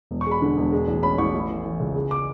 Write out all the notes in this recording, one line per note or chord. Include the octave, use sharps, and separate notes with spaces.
E1
C#6
G#3 B5
D3
E1
G#3
A1
C#4 B5
A1 C#6
A3
E3
E3
C#2
G#3
D6